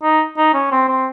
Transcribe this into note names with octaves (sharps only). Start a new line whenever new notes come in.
D#4
D#4
C#4
C4
C4